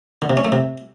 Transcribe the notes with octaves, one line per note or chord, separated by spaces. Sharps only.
D3
C3
C#4
A3
C3